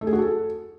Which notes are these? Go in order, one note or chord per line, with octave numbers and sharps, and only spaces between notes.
A3
G#4
F#4
A4